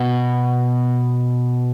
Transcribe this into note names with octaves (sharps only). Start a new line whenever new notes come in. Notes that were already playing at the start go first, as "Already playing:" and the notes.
Already playing: B2